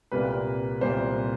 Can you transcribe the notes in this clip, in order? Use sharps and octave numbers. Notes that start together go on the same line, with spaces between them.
C2 A#2 G3 A#3 B4
C2 A#2 G3 A#3 C5